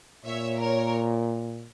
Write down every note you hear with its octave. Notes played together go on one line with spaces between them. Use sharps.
A#2 C#5 E5
A#4 C#5